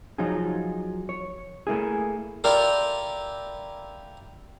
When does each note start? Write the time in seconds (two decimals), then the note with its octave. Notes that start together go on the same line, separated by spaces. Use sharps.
0.18 F3 F#3 D#4 F4 G#4
1.09 C#5
1.67 A3 A#3 E4 G#4
2.44 E4 F4 G4 A4 A#4 D5